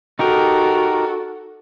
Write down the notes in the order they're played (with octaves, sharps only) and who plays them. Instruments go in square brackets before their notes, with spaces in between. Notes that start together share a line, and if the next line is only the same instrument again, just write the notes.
[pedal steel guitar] D#4 G4 A#4 [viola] F#4 A4